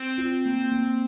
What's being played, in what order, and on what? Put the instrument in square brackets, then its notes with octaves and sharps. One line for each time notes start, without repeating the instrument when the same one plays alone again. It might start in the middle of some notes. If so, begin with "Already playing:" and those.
Already playing: [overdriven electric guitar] C4
[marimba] F4
A#3
A#3